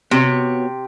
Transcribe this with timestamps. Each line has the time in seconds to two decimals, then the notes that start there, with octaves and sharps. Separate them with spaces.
0.11 C3 B3 F#4 C#5